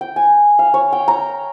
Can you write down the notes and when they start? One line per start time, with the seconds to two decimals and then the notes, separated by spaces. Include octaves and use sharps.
0.01 G5
0.16 G#5
0.59 F5
0.74 C#5
0.93 G5
1.08 A#5